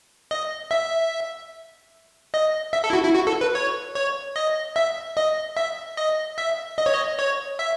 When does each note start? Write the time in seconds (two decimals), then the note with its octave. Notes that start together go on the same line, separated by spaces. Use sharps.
0.31 D#5
0.71 E5
2.34 D#5
2.73 E5
2.84 A4
2.90 E4
2.93 F#4
3.05 E4
3.15 F#4
3.27 A4
3.41 B4
3.55 C#5
3.95 C#5
4.36 D#5
4.76 E5
5.17 D#5
5.57 E5
5.97 D#5
6.38 E5
6.78 D#5
6.86 C#5
6.93 D#5
7.19 C#5
7.59 E5